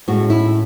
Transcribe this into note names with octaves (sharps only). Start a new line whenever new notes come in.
A2 G#3 C#4 F#4
E4